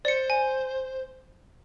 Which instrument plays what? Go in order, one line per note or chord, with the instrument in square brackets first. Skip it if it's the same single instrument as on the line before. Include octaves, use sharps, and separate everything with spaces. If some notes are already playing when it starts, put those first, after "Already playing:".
[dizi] C5 [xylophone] D5 C#7
[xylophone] G#5